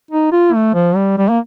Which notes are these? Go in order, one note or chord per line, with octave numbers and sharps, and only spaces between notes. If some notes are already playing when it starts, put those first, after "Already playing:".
D#4
F4
A3
F3
G3
G3
A#3